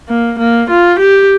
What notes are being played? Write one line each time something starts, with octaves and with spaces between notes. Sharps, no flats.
A#3
A#3
F4
G4